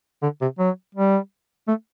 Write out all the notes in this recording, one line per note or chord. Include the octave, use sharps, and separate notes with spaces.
D3
C3
F#3
G3
A3